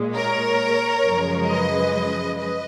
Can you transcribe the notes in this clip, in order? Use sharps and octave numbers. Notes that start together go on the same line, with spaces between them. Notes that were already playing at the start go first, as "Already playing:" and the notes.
Already playing: A#2 G#3
A#4 C#5
F#2 C#3 F3 G#3
B4 D#5
B4 D#5